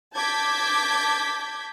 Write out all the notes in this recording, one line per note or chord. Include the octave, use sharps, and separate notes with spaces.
A5 D6 G6 G#6 B6